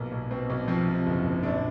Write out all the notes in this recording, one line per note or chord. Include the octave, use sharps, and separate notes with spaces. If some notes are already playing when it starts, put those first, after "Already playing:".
Already playing: B1 A#2 A#3
B1
B2 C4
B1
F3 C4
C3
F#1
F#1
A#1 D4